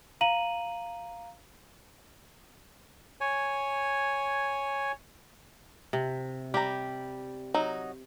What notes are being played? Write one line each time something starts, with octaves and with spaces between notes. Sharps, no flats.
F5 A#5 D#7 F#7
C#5 G#5
C3
G3 G4 A#5
F#3 D#4